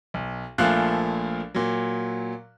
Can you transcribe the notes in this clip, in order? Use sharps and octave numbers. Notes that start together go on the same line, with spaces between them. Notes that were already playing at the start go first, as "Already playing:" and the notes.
B1
A#1 A#2 F3 A3 F5 F#6
A#2 F#3